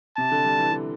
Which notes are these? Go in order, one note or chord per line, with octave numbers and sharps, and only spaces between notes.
C3 A5
D3
G3
E3
D3